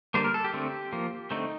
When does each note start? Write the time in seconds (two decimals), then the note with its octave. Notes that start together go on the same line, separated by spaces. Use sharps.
0.14 D3 G3 A#3 C5
0.24 A#4
0.34 A4
0.44 G4
0.53 D3 A3 C4
0.93 F3 A#3
1.31 D3 A3 C4 D#4